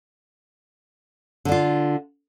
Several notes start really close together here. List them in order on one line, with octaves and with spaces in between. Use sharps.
D3 D4 F4